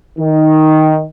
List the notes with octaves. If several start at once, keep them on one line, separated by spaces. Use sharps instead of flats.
D#3